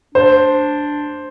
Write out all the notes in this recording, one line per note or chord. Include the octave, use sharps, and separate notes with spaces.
D4 C5